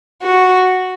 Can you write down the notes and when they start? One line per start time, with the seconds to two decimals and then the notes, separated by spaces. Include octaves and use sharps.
0.23 F#4